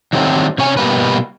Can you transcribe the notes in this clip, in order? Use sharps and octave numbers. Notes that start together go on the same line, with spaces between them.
D#3 F#3 G3 A3 B3 C4
C3 C#4 C#5 G#5
B2 G3 A#3 B4